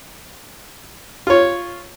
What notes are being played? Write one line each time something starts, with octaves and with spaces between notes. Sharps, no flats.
F4 C#5